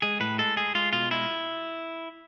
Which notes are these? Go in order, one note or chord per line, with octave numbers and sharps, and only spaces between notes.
G#3 G#4
A2 B4
G#3 A4
G#3 G#4
G#3 F4
B2 F4
G#3 E4